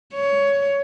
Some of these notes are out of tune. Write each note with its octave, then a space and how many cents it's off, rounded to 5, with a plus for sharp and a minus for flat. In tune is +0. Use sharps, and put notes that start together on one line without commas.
C#5 +15